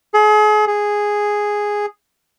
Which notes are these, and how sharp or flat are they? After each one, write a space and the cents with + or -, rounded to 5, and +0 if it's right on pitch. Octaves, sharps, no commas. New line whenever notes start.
G#4 +35
G#4 -5